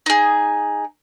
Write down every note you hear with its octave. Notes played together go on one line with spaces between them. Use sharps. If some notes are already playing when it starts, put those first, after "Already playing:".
D#4 G#4